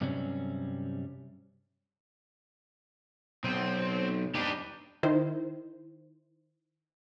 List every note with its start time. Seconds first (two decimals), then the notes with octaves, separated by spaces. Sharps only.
0.01 G2 C3 F#3 G3 C4 C#4
3.44 B1 C4
4.35 D4 D#4 G4 B4
5.03 D#3 E4 C5